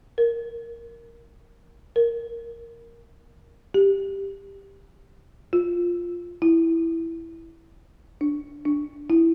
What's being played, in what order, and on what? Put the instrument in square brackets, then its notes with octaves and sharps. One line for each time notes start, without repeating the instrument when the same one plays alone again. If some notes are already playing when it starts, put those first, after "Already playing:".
[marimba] A#4
A#4
G4
F4
E4
D4
D4
E4